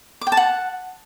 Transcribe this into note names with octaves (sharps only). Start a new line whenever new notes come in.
D6
G5
A5
F#5